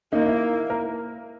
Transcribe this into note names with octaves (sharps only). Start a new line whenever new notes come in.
A#3 D#4
E4
A#4